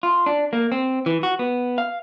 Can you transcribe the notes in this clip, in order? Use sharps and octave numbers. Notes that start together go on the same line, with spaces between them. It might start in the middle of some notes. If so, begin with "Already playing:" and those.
F4
D4
A#3
C4
E3
F#4
B3
F5